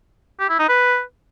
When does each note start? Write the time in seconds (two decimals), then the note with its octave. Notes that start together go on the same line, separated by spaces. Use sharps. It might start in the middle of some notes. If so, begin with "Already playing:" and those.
0.40 G4
0.49 E4
0.59 D#4
0.69 B4